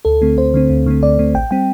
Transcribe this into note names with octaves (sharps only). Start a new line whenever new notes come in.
D2 A4
D3 A3 C4
D2 C5
D3 A3 C4
D2
D3 A3 C4
D2 D5
D3 A3 C4
A1 G5
G3 C4 G5